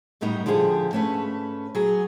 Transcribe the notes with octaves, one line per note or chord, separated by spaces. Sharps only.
F#2 A2 G3 B3 D#4
D3 F3 G4 G#4
G#2 A3 C#4 B4
F#3 G#4